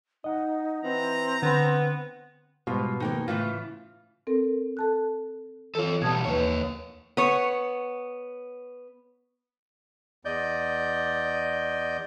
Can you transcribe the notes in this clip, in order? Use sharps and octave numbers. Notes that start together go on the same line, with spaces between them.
D#4 D#5 F#5
E3 C4 A#5
D3 B3 B5
G#2 B2 G3 F4
F2 D#3 A#3 D#4 G5
A2 C#3 E3 F4
C4 A4 A#4
A4 A5 F#6
E3 F4 A4 C#5
B2 G3 A5 D#6 G#6
D#2 A#3 B4 C#5
B3 C#5
E2 D5 D#5 G6